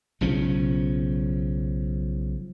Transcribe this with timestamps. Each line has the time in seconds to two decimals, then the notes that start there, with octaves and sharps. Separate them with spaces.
0.21 B1 C#3 F3 C#4